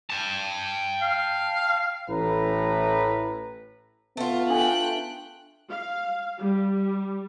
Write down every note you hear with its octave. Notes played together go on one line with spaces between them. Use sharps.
G5 A5
F5
A1 A2 E3 B4 A#5
A3 B3 F4
D4 A4 G5 G#5 F#6
F5
G3